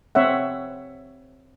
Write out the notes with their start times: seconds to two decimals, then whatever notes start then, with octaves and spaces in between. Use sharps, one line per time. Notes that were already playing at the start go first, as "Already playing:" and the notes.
0.15 C4 C#5 E5 F#5